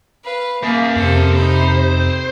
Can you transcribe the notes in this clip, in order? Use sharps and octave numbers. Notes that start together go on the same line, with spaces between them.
B4 F5
A#3 G#4 A#4 E5
F2 C3 A4 C5
D#4 C5 B5
C4